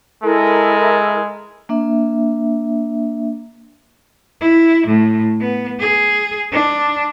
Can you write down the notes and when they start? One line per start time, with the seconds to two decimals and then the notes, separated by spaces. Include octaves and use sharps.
0.23 G#3 E4 A4 A#4
1.69 A#3 D4 E5
4.41 E4
4.87 A2
5.41 B3
5.79 G#4
6.52 D4